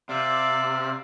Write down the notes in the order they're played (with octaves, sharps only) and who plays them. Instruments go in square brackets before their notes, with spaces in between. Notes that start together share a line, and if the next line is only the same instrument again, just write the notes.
[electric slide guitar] C3 [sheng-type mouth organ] D5 E5 F5